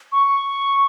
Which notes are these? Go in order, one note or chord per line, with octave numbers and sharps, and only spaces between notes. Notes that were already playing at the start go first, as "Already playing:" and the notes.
C#6